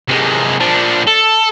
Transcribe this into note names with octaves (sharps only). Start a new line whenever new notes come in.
C3 G#3
F3 D4
A4